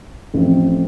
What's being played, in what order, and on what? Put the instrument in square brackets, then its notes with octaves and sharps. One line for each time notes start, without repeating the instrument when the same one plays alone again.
[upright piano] A1 A2 F3 C4